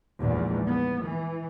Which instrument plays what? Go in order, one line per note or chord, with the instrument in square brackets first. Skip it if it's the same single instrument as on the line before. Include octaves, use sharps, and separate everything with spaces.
[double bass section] A#1 E2 G#2 G3
B3
E3